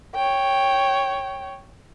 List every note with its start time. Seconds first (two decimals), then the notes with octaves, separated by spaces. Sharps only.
0.15 C#5 G5